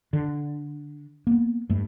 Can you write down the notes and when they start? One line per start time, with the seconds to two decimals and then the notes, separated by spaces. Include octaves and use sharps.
0.13 D3
1.27 A#3 B3
1.70 G2 A3